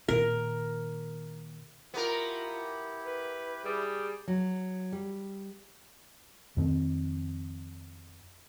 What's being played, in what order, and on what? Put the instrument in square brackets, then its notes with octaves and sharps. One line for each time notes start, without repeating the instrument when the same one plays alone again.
[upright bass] A#2 D#3 [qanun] A#4
[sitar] B3 A#4 [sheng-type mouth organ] E4 G4 [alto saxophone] F4
[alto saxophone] B4
[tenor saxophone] G3 [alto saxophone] G#4
[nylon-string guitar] F#3
G3
[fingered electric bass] F2 D#3 C4